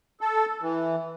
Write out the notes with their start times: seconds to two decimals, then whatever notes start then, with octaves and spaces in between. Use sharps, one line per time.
0.21 A4
0.62 E3